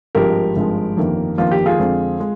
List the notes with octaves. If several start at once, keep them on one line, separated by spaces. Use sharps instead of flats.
G#1 G2 F3 G#3 G4 A#4
G#1 G2 F3 G#3
G1 F2 D#3 A#3
G1 F2 D#3 A#3 F4
G4
F4 G#4
F2 D3 G#3 C4
G#3